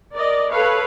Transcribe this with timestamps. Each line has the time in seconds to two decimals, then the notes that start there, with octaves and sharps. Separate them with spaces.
0.13 A#4 D5 D#5
0.50 A4 B4 C#5 F5